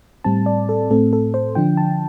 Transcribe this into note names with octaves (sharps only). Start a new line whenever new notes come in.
A2 G3 C4 A5
D5
A4
A2 A3 C4 A4
A4
C5
D3 F3 D4 G5
A5